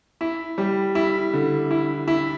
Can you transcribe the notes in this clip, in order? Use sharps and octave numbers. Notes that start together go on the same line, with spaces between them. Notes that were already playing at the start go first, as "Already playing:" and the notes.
E4
G3
E4
D3
E4
E4